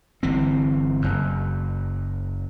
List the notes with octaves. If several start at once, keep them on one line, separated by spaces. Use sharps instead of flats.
G1 E3 C4
F#1 F#2